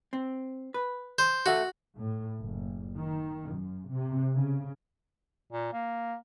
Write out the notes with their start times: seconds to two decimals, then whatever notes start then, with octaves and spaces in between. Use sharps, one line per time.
0.13 C4
0.74 B4
1.18 C5
1.46 F#4 A4 E5 F#5
1.98 A2
2.42 F#1
3.00 D#3
3.54 F#2
3.92 C3
4.34 C#3
5.52 A#2
5.73 A#3